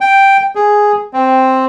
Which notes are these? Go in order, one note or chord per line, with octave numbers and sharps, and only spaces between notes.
G5
G#4
C4